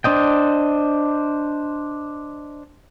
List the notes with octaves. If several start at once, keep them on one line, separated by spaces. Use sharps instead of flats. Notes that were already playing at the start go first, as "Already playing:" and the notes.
D4 C5 D#5 G5